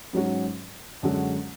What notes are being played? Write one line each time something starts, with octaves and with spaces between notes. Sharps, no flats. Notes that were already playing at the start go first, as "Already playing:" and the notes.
G#2 F#3 C#4 F#4
F#2 D3 G#3 C#4 F#4